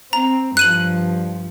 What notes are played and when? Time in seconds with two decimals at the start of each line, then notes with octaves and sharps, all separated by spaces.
0.13 C4 A#5
0.57 G2 F3 F#6 D#7 F#7